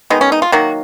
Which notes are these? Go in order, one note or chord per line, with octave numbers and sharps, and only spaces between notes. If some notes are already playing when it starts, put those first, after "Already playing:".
D#3 G#3 B3 D#4
C#4
D#4
F4
D#3 F#3 A#3 F#4